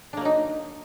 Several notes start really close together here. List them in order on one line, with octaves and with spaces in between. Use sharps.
D4 A#3 F#3 D#4